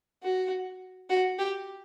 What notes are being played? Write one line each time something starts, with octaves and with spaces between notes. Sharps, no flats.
F#4
F#4
G4